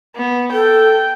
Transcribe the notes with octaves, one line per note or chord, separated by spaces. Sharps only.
B3
A4 G5